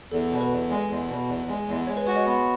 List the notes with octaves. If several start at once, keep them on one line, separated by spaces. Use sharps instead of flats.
E2 A4
B2
B4
E2
G#3
E2
B2
E2
G#3
E2
G#3 C#5
B4
F#4 C#5
D#5
B3